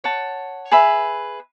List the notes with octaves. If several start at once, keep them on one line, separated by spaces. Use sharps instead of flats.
C#5 F#5 A5
G#4 B4 E5 B5